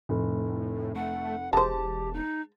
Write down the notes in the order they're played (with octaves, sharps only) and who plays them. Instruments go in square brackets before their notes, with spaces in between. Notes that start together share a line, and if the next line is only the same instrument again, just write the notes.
[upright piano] F1 [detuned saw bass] A2
[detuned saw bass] A3 [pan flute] F#5
[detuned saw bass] E1 [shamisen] G#3 C5 [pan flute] G4 [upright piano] A5
[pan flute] D#4